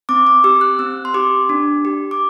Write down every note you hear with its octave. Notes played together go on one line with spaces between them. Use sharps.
C4 D6
D6
G4 E6
F#6
C4 E6
C6
G4 D6
D4
G4
D6